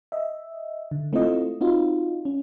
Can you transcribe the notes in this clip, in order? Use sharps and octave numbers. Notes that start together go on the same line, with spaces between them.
D#5 E5
D3
A3 C4 E4 F4 D#5
C4 D#4 F4 F#4
C#4